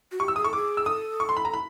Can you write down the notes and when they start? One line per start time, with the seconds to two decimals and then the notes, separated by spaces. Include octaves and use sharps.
0.12 F#4
0.19 G4 C#6
0.28 E6
0.36 G#4 D#6
0.44 A4 C#6
0.53 G#4 D6
0.77 E6
0.86 A4 D#6
1.20 C#6
1.29 C6
1.37 B5
1.45 A#5
1.54 B5